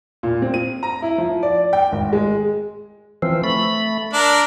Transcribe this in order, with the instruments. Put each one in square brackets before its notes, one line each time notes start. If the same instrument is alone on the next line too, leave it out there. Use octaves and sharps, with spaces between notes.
[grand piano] A#2
C4
D#7
A#5
E4
F3
D5
G5
G#1
G#3
[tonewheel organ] E3 F3 C4
A3 B5
[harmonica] D4 A#4 [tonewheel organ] B5